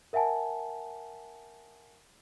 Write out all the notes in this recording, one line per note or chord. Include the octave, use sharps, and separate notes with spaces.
A#4 E5 F#5 G#5 A5